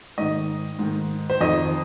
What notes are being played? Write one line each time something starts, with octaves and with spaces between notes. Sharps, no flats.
G#2 D#3 D#5
G#2 D#3
C5
F2 D#3 D#5